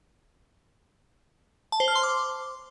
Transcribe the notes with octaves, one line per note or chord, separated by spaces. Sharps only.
A5
C5
F6
C6
D6